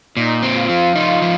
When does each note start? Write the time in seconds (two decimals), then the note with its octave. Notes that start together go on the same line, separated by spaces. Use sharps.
0.17 A#2 D#4
0.43 C4
0.56 F4
0.69 F3
0.95 D#4
1.22 F3